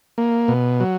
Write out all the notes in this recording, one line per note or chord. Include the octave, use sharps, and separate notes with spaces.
A#3
B2
F#3